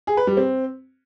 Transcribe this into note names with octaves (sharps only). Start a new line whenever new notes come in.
G#4
B4
G3
C4